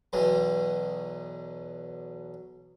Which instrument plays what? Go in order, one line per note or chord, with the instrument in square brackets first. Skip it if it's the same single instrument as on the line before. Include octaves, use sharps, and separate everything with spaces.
[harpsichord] B1 E2 B2 F#3